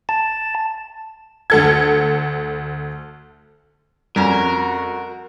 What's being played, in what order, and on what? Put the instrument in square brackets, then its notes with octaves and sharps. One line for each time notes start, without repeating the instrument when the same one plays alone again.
[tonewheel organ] A5
[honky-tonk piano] D2 A4 G#6
[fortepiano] F2 [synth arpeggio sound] G3 C#4 [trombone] F#4 [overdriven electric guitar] A#4